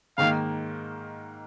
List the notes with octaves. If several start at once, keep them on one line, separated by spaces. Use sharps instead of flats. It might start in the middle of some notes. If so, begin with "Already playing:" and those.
G#2 D#3 A#3 F5